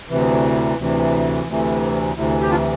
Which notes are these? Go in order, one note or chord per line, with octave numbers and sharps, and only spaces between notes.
D2 C3 E3
D2 C3 E3
D2 C3 E3
D2 C3 E3
G4
D4 F4